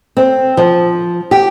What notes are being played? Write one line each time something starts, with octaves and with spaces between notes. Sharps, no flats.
C4
F3
G4